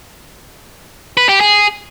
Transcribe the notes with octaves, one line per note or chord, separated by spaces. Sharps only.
B4
G4
G#4